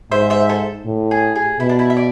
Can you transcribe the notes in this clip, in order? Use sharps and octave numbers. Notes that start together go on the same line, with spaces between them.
G#2 C5 E5
C5 E5
A4 C5
A2
G#4
G#4
B2 E4
D4
E4
E5
D5